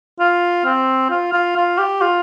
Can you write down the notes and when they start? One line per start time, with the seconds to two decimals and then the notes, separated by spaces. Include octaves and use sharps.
0.20 F4
0.65 C4
1.10 F4
1.33 F4
1.56 F4
1.78 G4
2.01 F4